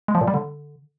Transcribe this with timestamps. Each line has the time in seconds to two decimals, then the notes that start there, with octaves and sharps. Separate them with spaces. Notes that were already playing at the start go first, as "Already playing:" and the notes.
0.08 G#3
0.15 F3
0.21 A#2
0.28 G3
0.34 D3